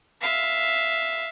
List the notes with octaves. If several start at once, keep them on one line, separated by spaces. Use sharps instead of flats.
E5 F5